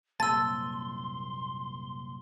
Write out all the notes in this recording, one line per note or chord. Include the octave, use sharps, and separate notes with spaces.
C2 F#2 A#2 A5 C6 E6 A6